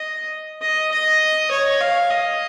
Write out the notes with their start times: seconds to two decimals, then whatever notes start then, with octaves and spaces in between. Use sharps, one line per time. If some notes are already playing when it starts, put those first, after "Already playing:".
Already playing: D#5
0.62 D#5
0.92 D#5
1.51 C#5
1.81 F5
2.10 D#5